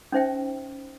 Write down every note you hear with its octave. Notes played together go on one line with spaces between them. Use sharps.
C#4 D#4 C5 E5 G5